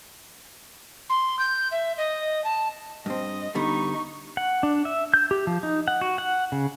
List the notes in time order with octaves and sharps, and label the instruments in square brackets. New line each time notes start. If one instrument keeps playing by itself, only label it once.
[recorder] C6
G6
E5
D#5
A5
[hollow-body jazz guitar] G2 C4 [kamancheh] D#5
[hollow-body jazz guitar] D3 G3 B3 [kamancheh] D#4 C#6
[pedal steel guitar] F#5
D4
E5
G6
G4
F3
D#4
F#5
F#4
F#5
C#3